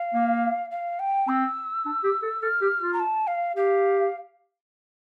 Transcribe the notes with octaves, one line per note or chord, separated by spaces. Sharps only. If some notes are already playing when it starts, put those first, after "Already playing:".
Already playing: F5
A#3
F5
G5
C4 E6
D4
G4
A4
A4 F6
G4
F4
A#5
A5
F5
G4 F5